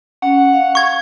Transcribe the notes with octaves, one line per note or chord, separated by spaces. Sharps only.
C#4 F#5
F5
C#6 G#6